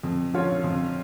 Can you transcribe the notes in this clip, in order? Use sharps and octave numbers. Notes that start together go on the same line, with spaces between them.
F2
F3 C#4 F4 C#5
F2